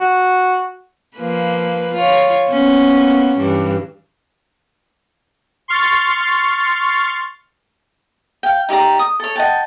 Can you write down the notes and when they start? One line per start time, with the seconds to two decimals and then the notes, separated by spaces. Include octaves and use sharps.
0.01 F#4
1.16 F3 A#3 B4
1.93 F4 C#5
2.48 A#3 B3 C#4
3.37 G2 E3
5.68 C6 C#6 F6 A6
8.43 F5 G5
8.69 D#4 G4 D5 A#5
8.99 D#6
9.20 A4 C#5
9.36 D#5 F#5 G5 A5